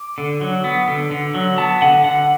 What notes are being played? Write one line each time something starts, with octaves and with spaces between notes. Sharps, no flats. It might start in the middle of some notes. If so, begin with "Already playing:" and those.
Already playing: D6
D3
F#3
B3
D3
D3
F#3
B3 A5
D3 F#5
D3 F#5